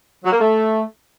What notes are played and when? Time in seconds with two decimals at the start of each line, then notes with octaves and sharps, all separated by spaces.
0.24 F#3
0.32 A#3
0.40 A3